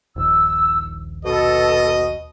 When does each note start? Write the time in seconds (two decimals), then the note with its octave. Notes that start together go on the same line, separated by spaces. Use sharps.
0.16 D#1 A#1 D#2 E6
1.25 B2 A4 D#5